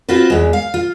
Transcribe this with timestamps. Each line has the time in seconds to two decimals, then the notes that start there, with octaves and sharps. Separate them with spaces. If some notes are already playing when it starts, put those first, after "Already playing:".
0.09 C4 F4 F#4 B4
0.30 E2 G#3
0.53 F5
0.74 F4